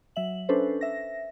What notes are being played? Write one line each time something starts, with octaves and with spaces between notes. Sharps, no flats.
F#3 E5 F#7
C#4 D4 A4 B4 C5
E5 A#6